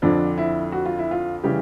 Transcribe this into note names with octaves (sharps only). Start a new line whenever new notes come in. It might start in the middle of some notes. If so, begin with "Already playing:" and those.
F2 D3 F3 D4
E4
F#4
F4
E4
F4
C#3 E3 G3 G4